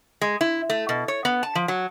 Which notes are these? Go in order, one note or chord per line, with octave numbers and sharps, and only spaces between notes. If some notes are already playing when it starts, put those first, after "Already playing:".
G#3
E4
A3
B2
C#5
B3
A5
F3
F#3